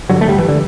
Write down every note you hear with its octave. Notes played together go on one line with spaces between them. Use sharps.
G2 D3 F#3
A3
G3
E3
D3